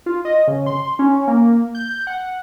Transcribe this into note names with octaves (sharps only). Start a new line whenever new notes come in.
F4
D#5
C#3
C6
C#4
A#3
G6
F#5